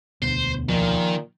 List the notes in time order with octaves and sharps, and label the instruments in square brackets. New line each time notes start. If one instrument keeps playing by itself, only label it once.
[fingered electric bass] E1 D2 B2 [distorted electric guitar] C5
[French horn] A#2 [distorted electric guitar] D#3 [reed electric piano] F3